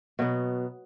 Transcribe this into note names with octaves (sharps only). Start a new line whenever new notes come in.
B2 F#3 B3